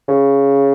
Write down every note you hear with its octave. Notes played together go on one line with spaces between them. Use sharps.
C#3